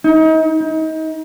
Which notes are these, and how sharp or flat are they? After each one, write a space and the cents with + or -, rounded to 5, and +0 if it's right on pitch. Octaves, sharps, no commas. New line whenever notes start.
D#4 +35
D#4 +30